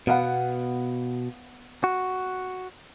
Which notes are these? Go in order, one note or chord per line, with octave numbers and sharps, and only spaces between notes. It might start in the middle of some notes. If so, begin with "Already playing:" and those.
B2 B3 F5 F#5
F#4